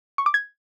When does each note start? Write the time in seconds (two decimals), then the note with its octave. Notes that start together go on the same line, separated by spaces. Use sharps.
0.18 C#6
0.26 D6
0.34 G#6